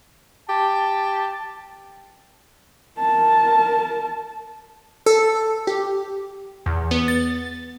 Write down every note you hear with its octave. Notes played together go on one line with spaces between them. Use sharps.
G4 A5
A#4 A5
A4
G4
E2
B3
A6